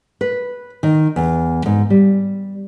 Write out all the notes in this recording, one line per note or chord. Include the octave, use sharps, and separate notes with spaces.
B4
D#3
E2
G#2
G3